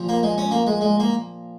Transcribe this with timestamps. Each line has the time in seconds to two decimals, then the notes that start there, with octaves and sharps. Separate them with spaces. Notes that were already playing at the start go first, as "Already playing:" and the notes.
Already playing: A#2 F3
0.09 A#3
0.23 G#3
0.38 C#4
0.51 A#3
0.67 G#3
0.81 G#3
1.00 A#3